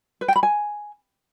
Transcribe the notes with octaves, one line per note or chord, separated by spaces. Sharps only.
B4
G5
B5
G#5